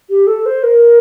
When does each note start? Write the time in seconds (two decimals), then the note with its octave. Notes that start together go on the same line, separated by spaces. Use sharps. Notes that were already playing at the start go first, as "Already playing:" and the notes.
0.10 G4
0.27 A4
0.46 C5
0.63 A#4